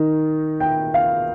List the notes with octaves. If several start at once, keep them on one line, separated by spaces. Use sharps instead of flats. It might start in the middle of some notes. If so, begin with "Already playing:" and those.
Already playing: D#3 D#4
G5
F5